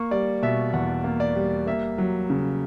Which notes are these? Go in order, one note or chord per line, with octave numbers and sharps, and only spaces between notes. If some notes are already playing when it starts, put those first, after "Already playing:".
Already playing: A#3 C#6
G3 D5
B2 E5
E2 F#5
A#3
D5
G3
A#3 E5
F#3
C#3